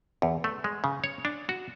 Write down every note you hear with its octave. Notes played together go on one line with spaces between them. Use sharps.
E2
A3
G#3
C#3
C#5
D4
F#4